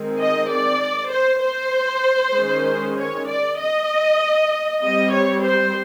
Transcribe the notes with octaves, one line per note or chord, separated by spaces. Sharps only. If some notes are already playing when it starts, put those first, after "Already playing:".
Already playing: D#3 G#3 C4
D#5
D5
C5
C5
D#3 G#3 C#4
C#5
D5
D#5
G3 C4 D#5
C#5
C5